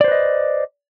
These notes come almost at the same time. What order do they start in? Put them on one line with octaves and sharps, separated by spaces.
D5 C5 B4 D#5